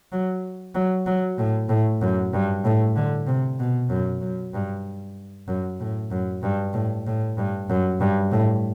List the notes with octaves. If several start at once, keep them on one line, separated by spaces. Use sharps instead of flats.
F#3
F#3
F#3
A2
A2
F#2
G2
A2
D3
C3
B2
F#2
F#2
G2
F#2
A2
F#2
G2
A2
A2
G2
F#2
G2
A2